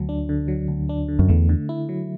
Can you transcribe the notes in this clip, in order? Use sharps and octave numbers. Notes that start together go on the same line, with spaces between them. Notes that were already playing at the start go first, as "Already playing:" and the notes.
Already playing: D2 F#3
D4
D3
F#3
D2
D4
D3
F#2
E2 A3
D3
E4
F#3